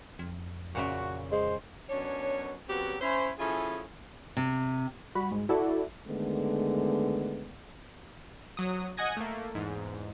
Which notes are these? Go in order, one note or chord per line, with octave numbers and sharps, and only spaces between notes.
F2
A#2 C#3 F#4 E5
G#3 C5
F#2 B2 C#4 D4 C#5
C#3 F#3 B3 C4 F#4 G4
C#4 E4 C5
F3 C#4 E4 F4 G#4 A4
C3
G3 F#4 B5
G#2 G#3
E4 F#4 A4 D5
D3 D#3 G#3 A3 B3
F#3 D#6
D#5 F#5 G#5 D#6 G#6 A#6
A3 A#3
E2 G#2